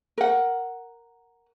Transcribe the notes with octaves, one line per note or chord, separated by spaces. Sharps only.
A#4 F#5